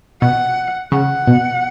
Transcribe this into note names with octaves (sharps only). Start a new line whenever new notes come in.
B2 F#5
C#3 F#5
B2